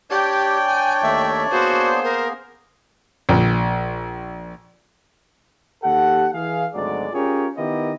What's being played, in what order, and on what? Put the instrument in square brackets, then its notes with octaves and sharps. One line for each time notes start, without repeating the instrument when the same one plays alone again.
[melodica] D4 C#5 D5 [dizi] G4 [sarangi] G5
[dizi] G#5
[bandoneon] D#2 D#3 A3 [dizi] E5
[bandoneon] A#3 B3 G#4 [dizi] F#4 [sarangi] C5
[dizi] A#4
[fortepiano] A#1
[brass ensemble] D#2 G4 A4 F#5
E3 G#4 F5
G#1 D2 F#3 G#3 D5
C#4 F4 G4 G#4 A#4 C#5
D#3 B3 E4 G4 A#4 D#5